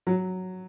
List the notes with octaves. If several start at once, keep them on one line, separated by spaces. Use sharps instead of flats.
F#3